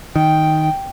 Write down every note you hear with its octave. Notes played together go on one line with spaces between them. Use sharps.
D#3 G5